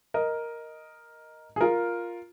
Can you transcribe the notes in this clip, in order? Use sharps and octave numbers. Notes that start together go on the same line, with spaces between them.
A#4 D#5
G#4
F4 A#4